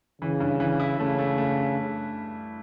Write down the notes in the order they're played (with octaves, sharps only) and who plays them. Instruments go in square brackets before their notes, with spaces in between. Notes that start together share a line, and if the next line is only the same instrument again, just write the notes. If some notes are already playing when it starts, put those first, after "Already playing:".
[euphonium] C#3 [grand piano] E3
[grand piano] G2
E3
E4
[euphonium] C#3 [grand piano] A3
[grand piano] A3
A3